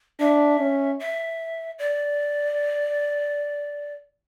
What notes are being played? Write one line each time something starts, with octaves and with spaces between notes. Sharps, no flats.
D4 E5
C#4
E5
D5